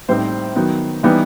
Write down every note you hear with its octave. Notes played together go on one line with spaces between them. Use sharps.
A2 G3 C4 D#4 C5
D#3 F#3 B3 D#4
E3 G3 B3 D#4